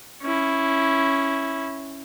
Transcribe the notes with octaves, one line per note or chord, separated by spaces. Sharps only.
C#4 E4